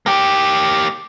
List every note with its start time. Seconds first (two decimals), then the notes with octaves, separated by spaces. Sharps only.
0.06 A#3 G4